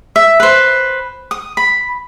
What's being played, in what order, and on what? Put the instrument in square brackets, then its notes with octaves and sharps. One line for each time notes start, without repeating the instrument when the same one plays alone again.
[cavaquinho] E5
B4 C5
D#6
B5